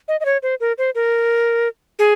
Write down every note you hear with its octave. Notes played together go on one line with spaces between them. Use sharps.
D#5
D#5
C#5
C5
A#4
C5
A#4
G#4